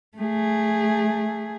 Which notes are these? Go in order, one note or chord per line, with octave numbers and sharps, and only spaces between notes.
A3 G#4